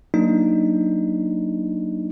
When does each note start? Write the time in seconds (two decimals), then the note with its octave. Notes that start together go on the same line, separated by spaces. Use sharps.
0.14 F#3 A#3 D4 D#4